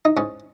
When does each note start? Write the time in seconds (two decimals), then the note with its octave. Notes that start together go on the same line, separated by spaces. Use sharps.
0.05 D#4
0.17 G#2 C#4